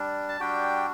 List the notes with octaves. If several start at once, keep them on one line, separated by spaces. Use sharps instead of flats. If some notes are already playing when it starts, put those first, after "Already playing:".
Already playing: G3 D4
A5
G3 D4 F#4 G4 G5